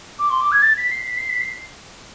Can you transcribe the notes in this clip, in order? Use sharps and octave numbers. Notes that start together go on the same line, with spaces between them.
D6
C6
D6
G#6
A6
B6
C7
B6
C7
B6
C7